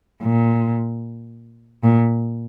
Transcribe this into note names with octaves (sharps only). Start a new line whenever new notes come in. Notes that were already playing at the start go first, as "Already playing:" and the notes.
A#2
A#2